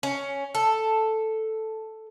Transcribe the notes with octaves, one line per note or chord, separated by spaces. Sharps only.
C#4
A4